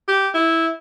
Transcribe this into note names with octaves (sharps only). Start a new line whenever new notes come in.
G4
E4